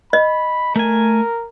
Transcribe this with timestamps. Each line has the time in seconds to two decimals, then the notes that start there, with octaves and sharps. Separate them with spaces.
0.13 D#5 B5
0.76 A3 A#4 G#5